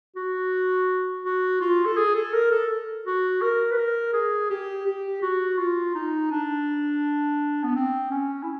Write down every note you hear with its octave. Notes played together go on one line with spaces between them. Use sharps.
F#4
F#4
F4
A4
G#4
A4
A#4
A4
F#4
A#4
B4
A#4
G#4
G4
G4
F#4
F4
D#4
D4
B3
C4
C#4
E4